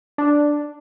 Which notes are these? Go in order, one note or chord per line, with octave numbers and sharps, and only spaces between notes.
D4